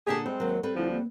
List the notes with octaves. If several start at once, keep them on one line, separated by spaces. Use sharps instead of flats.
A#2 D3 G4 G#4 A5
G3 G#3 C4
D#2 F#3 A#4
G3 C4 A4 B4
D2 D3 F3 E4
A#3